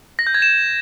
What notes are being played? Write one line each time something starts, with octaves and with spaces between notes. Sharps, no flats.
A#6
G6
G#6
E7